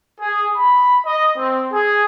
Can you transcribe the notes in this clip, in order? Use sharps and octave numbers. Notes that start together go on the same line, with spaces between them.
G#4
B5
D#5
C4
G#4